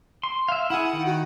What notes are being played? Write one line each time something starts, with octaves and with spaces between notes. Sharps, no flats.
C6
E5 F5
E4 G#4 F#5
D#3
F#4